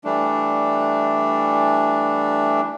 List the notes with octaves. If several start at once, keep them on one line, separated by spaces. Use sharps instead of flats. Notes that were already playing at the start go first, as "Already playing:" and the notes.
E3 G3 A3 D4